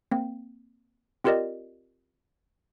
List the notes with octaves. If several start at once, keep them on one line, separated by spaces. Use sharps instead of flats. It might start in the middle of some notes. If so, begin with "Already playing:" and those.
A#3 C4
C4 F4 G4 A#4 D5 D#5